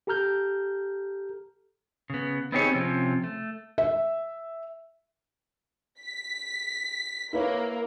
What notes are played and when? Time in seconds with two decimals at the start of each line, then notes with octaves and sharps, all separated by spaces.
0.07 G4 A4 A#5 F6 G6
2.10 C#3 B3
2.52 B3 C4 D#4 G4 G#4 C#5
2.74 C3 F3 C4 C#4
3.24 A3
3.78 E5
6.01 B6
7.33 A#3 E4 B4 C#5